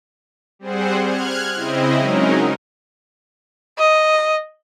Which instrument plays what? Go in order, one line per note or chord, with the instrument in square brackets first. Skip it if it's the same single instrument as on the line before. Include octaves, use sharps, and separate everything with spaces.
[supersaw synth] G3 C4 G#4 C5 F#5
F6 F#6 G#6
C#3 C4 E4 D#5
F#3 G#3 C#4 D#4 A#4
[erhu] D#5